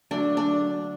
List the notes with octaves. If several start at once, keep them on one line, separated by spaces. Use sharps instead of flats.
D3 F#3 A3 D4
D4